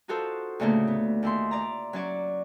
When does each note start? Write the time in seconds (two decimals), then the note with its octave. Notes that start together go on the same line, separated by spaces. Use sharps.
0.08 D#4 F4 F#4 A4 C5
0.60 D2 A2 C#3 A3 A#3
0.87 B3
1.23 D#2 E4 C6
1.51 D5 A#5
1.93 F#3 C#4 D5 C#6